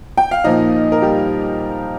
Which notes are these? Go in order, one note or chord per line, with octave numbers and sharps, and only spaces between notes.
G5
F5
A#2 F3 A#3 D#4 D#5
A#4
G3 G4